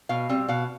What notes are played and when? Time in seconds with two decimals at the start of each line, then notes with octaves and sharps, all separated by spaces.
0.09 B2 F5
0.29 G3 C4
0.48 B2 F5